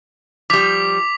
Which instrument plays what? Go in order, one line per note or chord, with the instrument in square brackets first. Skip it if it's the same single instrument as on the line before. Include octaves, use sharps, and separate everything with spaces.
[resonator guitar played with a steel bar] F3 G3 [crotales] D6 B6 F7